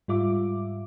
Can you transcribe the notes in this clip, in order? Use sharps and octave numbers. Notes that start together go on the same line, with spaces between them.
G#2 G3 F4 E5 D6